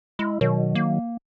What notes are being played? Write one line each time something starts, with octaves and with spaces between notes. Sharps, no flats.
G#3 E4
B2 D#3 F#3
A#3